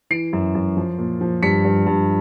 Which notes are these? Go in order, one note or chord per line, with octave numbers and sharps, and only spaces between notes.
E3 C7 D7
F#2
F#2
F3
A#2
F3
G2 B6 C#7
G2
G2